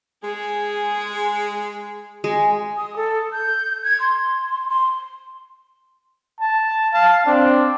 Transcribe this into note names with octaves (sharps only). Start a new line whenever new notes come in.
G#3 G#4
G#3
D#6
A4
G6
G#6
C6
C6
A5
F5 A5
C4 D4